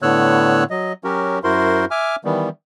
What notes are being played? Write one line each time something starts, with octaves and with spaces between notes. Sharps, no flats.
A2 D3 B3 C#5 E6 F#6
F#3 D#5
F#3 C#4 F#4 G4 A#4
F#2 E4 F#4 A#4 C5 C6
E5 G#5 D6 F6
D#3 E3 G3 B3